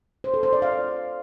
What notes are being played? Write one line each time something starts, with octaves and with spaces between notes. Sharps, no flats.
C5
A4
C5
D5
F5